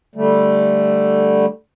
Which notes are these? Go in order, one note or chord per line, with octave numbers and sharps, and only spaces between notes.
D3 G3 A3